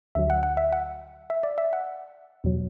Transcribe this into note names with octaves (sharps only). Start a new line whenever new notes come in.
D2 D3 F#3 E5
F#5
F#5
E5
F#5
E5
D5
E5
F#5
E2 B2 F#3